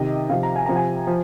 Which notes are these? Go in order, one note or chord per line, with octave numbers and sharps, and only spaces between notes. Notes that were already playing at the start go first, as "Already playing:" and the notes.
Already playing: C3 D#3 D#5
C3 F3 F5
A#5
G#5
C3 F3 A#5
G#5
F3